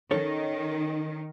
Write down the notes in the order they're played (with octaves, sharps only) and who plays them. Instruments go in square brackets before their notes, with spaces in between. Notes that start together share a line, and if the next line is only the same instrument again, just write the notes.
[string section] D#3 [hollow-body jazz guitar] C#4 A4 C#5